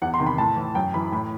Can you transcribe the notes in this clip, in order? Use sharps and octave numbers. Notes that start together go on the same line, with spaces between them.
E2 F#5
C6
C3 D#3
B5
A2 A5
E3
F#2 G5
E3 B5
A2 B5